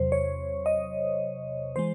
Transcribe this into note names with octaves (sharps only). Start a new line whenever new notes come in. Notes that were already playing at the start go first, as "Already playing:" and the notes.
Already playing: E2 C3 F#3 C5
C#5
D#5
E3 G#3 C5